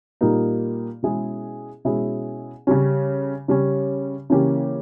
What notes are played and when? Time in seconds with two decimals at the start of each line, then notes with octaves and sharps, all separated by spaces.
0.21 A#2 G3 A#3 D#4
1.03 B2 G#3 C#4 E4 G#4
1.85 B2 G#3 C#4 E4 G#4
2.67 C#3 G3 C#4
3.48 C#3 G3 C#4
4.30 C#3 E3 A#3 C#4 G4